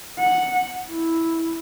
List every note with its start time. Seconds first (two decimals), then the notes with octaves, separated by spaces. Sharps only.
0.20 F#5
0.91 E4